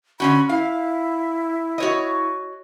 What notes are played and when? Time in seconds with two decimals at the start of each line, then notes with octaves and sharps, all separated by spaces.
0.20 D3 C#4 F#4 B5
0.49 E4 F5
1.78 F#4 C#5 D#5